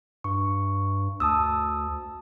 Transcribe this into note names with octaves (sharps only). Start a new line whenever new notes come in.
G2 C#6
D2 A5 D#6 E6